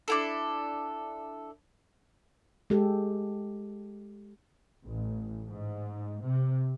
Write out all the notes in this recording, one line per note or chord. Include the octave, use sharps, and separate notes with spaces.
D4 E4 A4
G#3 G4 A4
A1
G#2
C3